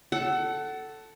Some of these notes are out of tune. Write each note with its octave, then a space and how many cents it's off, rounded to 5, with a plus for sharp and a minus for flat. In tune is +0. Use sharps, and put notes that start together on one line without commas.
A4 +0 F#5 +25